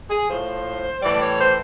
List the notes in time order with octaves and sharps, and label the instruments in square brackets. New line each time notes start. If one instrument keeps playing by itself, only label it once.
[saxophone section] G#4
A2 F3 C5
A2 E3 G3 D5
C#5
C5